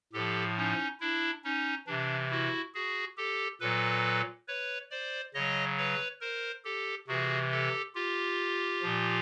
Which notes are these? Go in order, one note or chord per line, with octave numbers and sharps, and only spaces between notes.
A2 F3 G4 A4
C#4 D#4
D4 E4
C#4 D#4
C3 E3 D4
E4 F#4
F#4 G#4
G4 A4
A#2 F#3 A4 B4
B4 C#5
C5 D5
C#3 F#3 C#5 D#5
B4 C#5
A#4 C5
G4 A4
C3 E3 F#4 G#4
G4 A4
F4 G4
A#2 F3